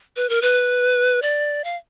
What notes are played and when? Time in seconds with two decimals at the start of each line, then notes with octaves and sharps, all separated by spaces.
0.16 B4
0.29 A#4
0.42 B4
1.22 D5
1.64 F5